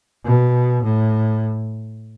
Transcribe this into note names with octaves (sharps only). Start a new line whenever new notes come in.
B2
A2